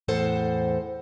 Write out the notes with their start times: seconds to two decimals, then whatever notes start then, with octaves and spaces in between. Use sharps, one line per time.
0.08 E2 A2 A4 C5 F#5